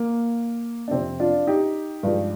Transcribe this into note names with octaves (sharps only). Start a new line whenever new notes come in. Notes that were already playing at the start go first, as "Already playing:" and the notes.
Already playing: A#3
D4
F2 C3 F3 C4
D4 F4
D#4 G4
G2 F3 G#3